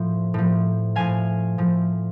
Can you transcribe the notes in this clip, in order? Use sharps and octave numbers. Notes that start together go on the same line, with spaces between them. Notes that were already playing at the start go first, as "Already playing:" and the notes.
Already playing: A2 F3
A2 F3
A2 F3 F5 G#5
A2 F3